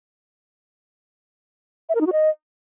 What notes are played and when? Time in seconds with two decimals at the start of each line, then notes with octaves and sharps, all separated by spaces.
1.89 E5
1.95 A#4
2.01 D#4
2.06 F#4
2.12 D#5